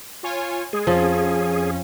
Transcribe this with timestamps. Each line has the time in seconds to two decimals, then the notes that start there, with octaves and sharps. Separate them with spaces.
0.23 F4 C#5 G#5
0.73 G#3 G#4
0.87 F2 F3 C#4